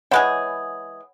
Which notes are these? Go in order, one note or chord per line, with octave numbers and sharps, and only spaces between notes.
E3 G#3 G#4 C#5 F#5 B5